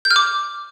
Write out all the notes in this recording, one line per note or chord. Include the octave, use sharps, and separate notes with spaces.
G6
F6
D6